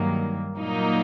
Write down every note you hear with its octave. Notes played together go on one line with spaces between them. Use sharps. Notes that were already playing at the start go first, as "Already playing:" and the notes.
Already playing: G2 D#3 F#3 A#3
A#2 F#3 A#3 D#4